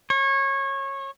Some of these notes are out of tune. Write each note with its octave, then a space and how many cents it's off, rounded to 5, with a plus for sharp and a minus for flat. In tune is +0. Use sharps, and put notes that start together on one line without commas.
C#5 -25